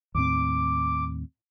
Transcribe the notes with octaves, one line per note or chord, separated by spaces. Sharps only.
D#2 A2 C4 D6